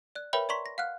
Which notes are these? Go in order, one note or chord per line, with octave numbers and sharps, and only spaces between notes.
D5 F#6
A#4 B4 C#5 E5 G5 B5
D5 A#5 C6 C#6 B6
A#6
F5 F#5 F6 F#6